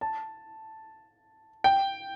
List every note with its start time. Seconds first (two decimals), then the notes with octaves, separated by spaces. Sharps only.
0.01 A5
1.64 G5